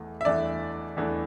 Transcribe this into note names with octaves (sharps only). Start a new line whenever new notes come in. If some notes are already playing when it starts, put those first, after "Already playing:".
Already playing: E2 E3 A3
E5
E2 E3 A3 D4 D5
E2 E3 A3 D4